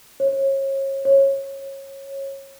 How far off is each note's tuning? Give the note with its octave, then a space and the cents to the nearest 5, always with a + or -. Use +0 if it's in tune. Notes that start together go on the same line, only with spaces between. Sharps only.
C#5 -35
C#5 -25